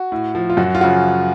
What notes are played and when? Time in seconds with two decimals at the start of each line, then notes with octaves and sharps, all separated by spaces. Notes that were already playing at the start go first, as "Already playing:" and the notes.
Already playing: F#4
0.12 A2
0.35 F3
0.50 F4
0.57 F#2 F#4
0.75 F4
0.81 C#3 F3 F#4